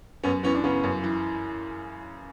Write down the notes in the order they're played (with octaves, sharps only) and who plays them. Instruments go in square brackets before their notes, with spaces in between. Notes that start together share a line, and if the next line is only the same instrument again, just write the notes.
[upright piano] F#2 [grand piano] B3 C#4
[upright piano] E3 [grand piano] B3 C#4
[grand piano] D4
[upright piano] C#3 [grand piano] B3 C#4
[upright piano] F#2
E3